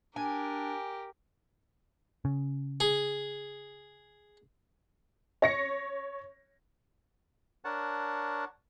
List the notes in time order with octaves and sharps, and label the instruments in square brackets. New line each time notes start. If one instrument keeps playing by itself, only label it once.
[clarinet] D4 [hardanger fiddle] G4 A#4 [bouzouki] G#5
[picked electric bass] C#3
[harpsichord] G#4
[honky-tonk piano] C#5 A#6 C#7
[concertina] D4 A#4 C#5 F#5 A5